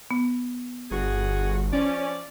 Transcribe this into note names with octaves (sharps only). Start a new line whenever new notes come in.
B3
G1 F#4 G#4
F3 C#4 D5